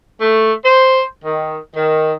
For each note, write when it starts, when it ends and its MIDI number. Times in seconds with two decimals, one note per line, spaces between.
0.21 0.53 57
0.65 1.02 72
1.24 1.57 51
1.74 2.12 51